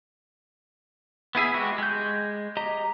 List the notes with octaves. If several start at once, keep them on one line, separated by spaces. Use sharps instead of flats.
B3 E4 G#4 E5
G#3 F#4 G4
G#3 G6
G4 D#5 A#5